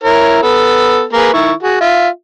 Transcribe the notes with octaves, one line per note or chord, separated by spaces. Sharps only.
E4 A#4 C#5
B3 A4
A#3 G#4 B4
D#3 E4 C#6
F#4 G#4
F4 E5